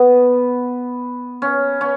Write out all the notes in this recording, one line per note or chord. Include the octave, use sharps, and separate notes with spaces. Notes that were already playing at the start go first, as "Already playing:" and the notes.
Already playing: B3
C#4
C#4